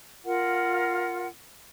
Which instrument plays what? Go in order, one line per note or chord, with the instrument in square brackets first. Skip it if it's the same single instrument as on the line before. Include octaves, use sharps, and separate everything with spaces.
[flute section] F4 A#4 F#5